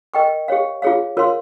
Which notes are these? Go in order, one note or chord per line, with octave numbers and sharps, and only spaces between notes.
A#4 D#5 G5 C#6
G4 C#5 F5
F4 G#4 C#5 F5
F4 A#4 C#5 F5 C6